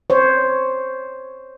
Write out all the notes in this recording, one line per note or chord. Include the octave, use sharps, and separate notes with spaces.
C5 C#5